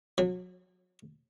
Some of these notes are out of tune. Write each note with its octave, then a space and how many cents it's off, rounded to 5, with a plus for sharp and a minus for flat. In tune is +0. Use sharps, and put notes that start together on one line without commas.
F#3 -30